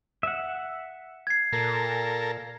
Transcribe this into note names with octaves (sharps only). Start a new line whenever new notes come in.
E5 F#5
G#6 C7
A#2 A4 A#4